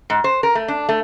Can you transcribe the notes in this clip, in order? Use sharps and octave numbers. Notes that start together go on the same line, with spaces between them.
G#2
C5
A#4
A3
D4
A3